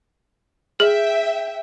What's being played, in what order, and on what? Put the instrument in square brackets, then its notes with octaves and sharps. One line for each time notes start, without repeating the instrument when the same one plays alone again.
[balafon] G#4 [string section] E5 G5